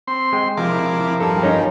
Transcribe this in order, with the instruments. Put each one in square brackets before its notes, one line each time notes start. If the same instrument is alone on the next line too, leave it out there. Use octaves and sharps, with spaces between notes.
[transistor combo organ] C4 C6
[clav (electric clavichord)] G#3 G5
[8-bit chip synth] C3 E4 D6 [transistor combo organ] F3 A#4
[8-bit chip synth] G2 G3 [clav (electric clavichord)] A4
[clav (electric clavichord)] C#4 D#4